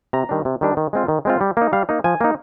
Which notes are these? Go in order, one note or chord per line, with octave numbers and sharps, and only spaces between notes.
C3 A#5
D#3 G3 D4
C3
D#3 G3 D4
D#3
G#3 C4 F4
D#3
G#3 C4 F4
G3
A#3 D#4
G3 F5
A#3 D#4
F3 G#5
A#3 D#4